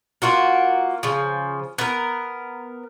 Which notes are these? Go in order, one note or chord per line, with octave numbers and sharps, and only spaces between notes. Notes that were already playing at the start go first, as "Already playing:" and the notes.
A#3 F4 F#4 A#4
C#3 F3
B3 A#4